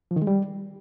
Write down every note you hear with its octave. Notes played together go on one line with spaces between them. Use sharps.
F3
D#3
G#3
G3